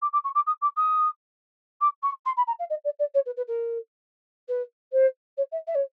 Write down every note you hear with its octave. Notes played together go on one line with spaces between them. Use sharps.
D6
D6
C#6
D6
D#6
D6
D#6
D6
C#6
C6
B5
A#5
F5
D#5
D5
D5
C#5
B4
B4
A#4
B4
C5
C#5
E5
E5
C#5